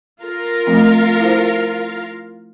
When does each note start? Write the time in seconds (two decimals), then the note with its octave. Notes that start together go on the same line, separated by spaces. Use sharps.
0.21 F4 A#4 F5
0.67 F3 A3 C4
1.20 E4 C5